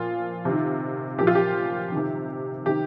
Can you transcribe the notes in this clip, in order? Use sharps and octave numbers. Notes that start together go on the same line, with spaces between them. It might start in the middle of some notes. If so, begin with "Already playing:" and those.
Already playing: A#2 F3 F4
C3 D#3
A#2 F3 G4
F4
G4
C3 D#3
C3 D#3 G4